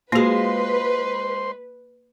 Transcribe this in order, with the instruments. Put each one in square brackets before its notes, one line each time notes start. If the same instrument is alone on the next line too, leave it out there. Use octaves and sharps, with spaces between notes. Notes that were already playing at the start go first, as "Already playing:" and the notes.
[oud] G#3 F4 [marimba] A#3 F#4 [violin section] B4 [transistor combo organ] C5 C6